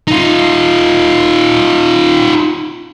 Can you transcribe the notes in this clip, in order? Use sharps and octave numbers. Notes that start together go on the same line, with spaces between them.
D#4 F4